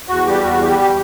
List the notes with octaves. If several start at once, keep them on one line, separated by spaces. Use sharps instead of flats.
E2 F#4
G3 G4
E2 F#4
G3 G4
G4